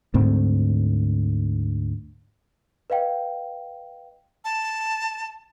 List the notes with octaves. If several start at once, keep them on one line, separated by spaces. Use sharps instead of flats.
D2 G#2 C4
B4 D#5 F5 G5
A5